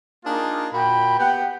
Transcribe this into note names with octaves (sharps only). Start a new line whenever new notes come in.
A#3 D4 D#4 F4 G#4 A#4
A#2 F#4 G5 B5
B3 G4 F#5 G5